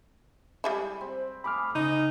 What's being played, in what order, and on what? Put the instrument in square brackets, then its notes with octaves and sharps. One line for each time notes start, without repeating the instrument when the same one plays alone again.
[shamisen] G3 G#3 E4
[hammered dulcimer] C4 B5
[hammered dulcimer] A3 G#4 F5 [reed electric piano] B5 D6 F6
[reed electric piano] C#3 [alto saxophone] D#4 [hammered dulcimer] D#5